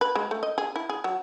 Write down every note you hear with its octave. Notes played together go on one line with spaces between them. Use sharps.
B4
G#3
A3
D#5
G#4
E4
G#4
F#3